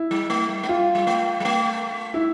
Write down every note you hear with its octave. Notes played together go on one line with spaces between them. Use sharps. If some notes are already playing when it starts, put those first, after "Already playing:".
Already playing: E4
G3
A3
G3
A3
G3 F4
G3
A3
G3
A3
E4